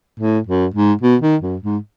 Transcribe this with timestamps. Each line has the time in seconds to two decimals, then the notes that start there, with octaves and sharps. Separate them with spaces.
0.20 A2
0.47 F#2
0.74 G#2
1.02 B2
1.22 D#3
1.42 F#2
1.63 G#2